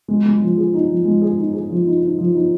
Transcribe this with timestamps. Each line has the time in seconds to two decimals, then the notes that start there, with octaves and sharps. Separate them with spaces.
0.08 G#3
0.26 G#3
0.42 F3
0.57 G#4
0.74 D#4
0.89 F3
1.05 G#3
1.22 G#4
1.37 D#4
1.54 G#4
1.70 F3
1.86 D#4
2.02 D#4
2.18 F3
2.35 D#4